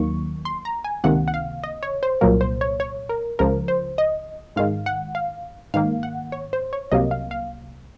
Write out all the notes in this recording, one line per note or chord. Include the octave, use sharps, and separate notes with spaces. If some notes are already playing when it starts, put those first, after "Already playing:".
Already playing: D#2 D#3 F#3 A#3 C#6
C6
A#5
G#5
C#2 C3 D#3 A#3 F#5
F#5
F5
D#5
C#5
C5
C2 A#2 F#3 A#3 A#4
C5
C#5
C#5
A#4
C#2 C#3 F3 A#4
C5
D#5
G#2 D#3 G#3 F5
F#5
F5
G#2 D#3 A#3 F5
F#5
C#5
C5
C#5
C2 C3 F#3 A#3 D#5
F5
F5